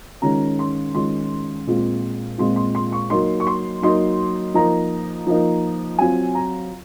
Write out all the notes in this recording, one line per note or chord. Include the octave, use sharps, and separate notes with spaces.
D#3 G#3 C#4 F4 A#5
C6
D#3 G#3 C#4 F4 C6
A#2 G#3 C4 F4
A#2 G#3 C4 F4 C6
C6
C6
C#6
F#3 A#3 D#4 C6
C#6
C6
F#3 A#3 D#4 C6
F3 A#3 D#4 A#5
F3 A#3 D#4
F#3 C4 F4 G#5
A#5